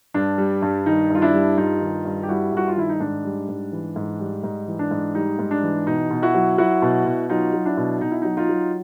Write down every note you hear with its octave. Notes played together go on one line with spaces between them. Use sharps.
G2 D4
G3
G2
D#3 D#4
G2 F4
D4 E4
G3
G2 D#4 F4
D#3
G2
G4
G3 E4 F#4
G2 F#4
F4
D#3 E4
D#4
G#2 D4
G3
G#2
E3
G#2
G3
G#2 D#4
E3
D4
G#2
G3 D#4
G#2
D4
E3
B2 D#4
B2
E4 F#4
F#3
F#3 E4 F#4
B2
B2
F#3 D#4 F4
F#3
D4 E4
B2
B2 D#4
E4
F#3 D#4
D#4 F4
F#3